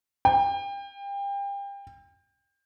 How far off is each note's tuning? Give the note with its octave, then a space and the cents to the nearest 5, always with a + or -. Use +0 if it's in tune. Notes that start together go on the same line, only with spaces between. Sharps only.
G5 +30